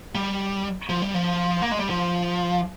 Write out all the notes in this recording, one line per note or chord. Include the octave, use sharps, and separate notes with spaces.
G3
F3
G3
F3
A#3
G#3
G3
F3